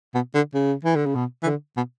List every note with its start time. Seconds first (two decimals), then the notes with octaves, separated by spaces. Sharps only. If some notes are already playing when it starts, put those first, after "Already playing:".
0.14 B2
0.35 D3
0.54 C#3
0.84 E3
0.95 D3
1.06 C#3
1.15 B2
1.43 E3
1.46 D3
1.77 B2